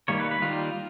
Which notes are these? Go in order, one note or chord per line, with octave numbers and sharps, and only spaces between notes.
D#3 G3 A#3 C#5
B4
B4
D#3 G3 A#3 F4